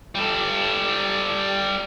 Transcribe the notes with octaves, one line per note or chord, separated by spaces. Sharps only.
G3 A4